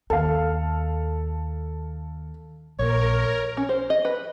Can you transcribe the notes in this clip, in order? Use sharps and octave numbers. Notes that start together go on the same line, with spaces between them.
D#2 A4 F5
A#1 A#2 A#4 C#5
C#4
C5
D#5
B4